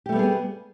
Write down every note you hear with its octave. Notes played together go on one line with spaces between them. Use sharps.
G3 A3 B3 G4 G#4